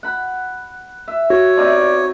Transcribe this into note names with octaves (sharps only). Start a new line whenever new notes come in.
F#5 B5
E5
F#4 C#5
C3 B3 D#4 F4 D5 C6